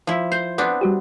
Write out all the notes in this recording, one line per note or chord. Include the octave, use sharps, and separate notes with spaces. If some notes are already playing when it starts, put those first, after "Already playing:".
F3 E4
C5 G6 C7
B3 C4 D4
G3 F#4 G4